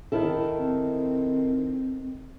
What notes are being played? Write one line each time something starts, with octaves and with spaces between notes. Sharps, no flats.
D#3 E4 A4
C4